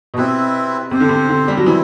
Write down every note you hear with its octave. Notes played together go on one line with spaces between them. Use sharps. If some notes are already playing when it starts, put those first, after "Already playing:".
B2
C3 C4 E4 B4
C3 C4 G4 C5
D3
C3
D3
G3
F#3
E3 G3 C4 E4